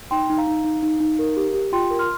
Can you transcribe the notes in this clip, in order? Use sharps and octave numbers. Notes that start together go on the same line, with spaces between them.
D#4 G5 C6
D#4
F5 A#5
D#4
D#4
D#4
D#4
A#4
G4
G4
F4 G5 C6
A#4
C6 F6